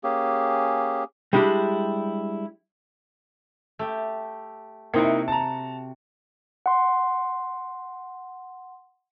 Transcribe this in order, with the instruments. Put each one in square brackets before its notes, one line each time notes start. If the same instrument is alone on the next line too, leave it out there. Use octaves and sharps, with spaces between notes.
[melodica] A#3 C#4 G4 G#4
[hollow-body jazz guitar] G3 G#3 D4 E4 G4
[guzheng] A3 G4
[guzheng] C3 F#4 [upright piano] A#3 D#4 E4
[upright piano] A5 A#5
[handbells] F#5 C6